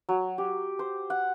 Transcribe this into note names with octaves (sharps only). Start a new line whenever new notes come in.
F#3
G4
C5
F#5